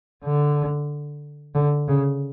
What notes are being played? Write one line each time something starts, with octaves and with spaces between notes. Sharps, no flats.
D3
D3
C#3